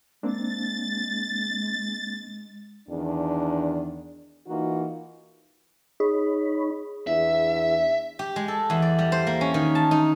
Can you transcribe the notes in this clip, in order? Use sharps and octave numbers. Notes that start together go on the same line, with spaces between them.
G#3 A#3 C4 D4 A6
E2 D#3 D4
E3 A#3 D#4 F4 F#4
D#4 G#4 C#5 B5
E2 D4 E5
G4
G#3
A4
E2
D5
G3
C5
A#3
C#4
D#3
A5
D#4